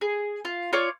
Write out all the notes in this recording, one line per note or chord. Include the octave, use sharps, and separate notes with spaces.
G#4
F4
F4 C#5 D5